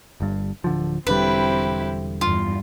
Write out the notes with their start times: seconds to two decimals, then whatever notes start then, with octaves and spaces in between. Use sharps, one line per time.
0.20 G1 G2
0.64 D1 D3 F3
1.07 E1 D3 G3 C4 E4 G4 B4
2.21 E2 G2 F4